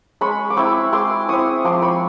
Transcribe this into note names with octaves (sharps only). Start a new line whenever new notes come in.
G#3 B5 C#6
D6
C4 E4 B5 C#6
G#3 C6 D6
C4 E4 C#6 D#6
F3 C6 D6
B5 C#6